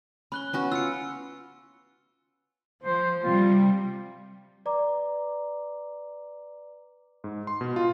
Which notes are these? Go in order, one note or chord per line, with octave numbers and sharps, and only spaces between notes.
C#4 B5 F#6 G7
B3 C#4 F#4
F4 E6 C#7
F3 C5
C3 G3 F4
B4 D5 A#5 D6
G#2
C6
B2
F4